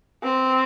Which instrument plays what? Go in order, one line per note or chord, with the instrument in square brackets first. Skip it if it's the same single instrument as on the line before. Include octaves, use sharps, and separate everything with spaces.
[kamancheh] C4